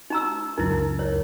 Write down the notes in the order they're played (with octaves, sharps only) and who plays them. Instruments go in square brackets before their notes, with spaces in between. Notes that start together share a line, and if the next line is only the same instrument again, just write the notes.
[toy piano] D#4 A#5 E6
[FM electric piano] C#2 F#2 A#4 [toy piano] D#4 E4
[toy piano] C#5